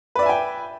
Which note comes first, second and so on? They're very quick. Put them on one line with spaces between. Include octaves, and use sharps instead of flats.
B4 D5 E5 G#5 G5